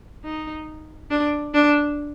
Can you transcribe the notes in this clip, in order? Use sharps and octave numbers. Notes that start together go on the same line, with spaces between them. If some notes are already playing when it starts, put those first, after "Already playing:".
D#4
D4
D4